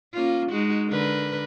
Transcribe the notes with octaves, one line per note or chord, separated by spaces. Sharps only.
A#3 C#4 F4
G#3 D#4 F#4
D3 A#4 B4